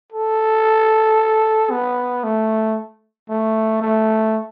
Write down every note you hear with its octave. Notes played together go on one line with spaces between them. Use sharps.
A4
B3
A3
A3
A3